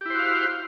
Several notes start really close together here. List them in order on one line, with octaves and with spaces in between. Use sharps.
G4 E4 C5 F#4 F5